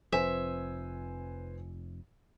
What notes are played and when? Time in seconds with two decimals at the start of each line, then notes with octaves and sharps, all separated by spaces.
0.12 F1 F3 C4 B4 C5 E5 G#5